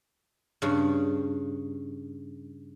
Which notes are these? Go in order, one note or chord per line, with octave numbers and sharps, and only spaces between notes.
G2 C#3